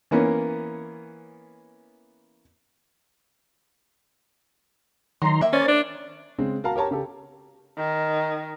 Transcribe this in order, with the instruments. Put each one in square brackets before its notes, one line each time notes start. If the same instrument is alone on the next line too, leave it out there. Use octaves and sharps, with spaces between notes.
[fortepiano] E3 A#3 B3 C#4
[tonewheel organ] D#3 A#5 C6 [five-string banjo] F#3 D#4
[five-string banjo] A#3 E5
[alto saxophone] C#4 [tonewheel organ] C5 D5 A6
[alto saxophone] D4
[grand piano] C#3 G#3 C4
F#4 A#4 F5 A5 A#5
G4 A#4 C#5 A5 A#5
C#3 G4 A4
[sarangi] D#3